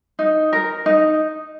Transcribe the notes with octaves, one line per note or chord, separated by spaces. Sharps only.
D#4
A#4
D#4